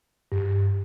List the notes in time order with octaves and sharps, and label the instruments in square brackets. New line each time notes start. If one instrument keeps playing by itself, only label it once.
[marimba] G2